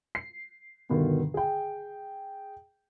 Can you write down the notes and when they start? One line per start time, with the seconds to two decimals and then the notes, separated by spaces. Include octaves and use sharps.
0.15 C7
0.89 G2 B2 D3 D#3
1.34 G#4 G5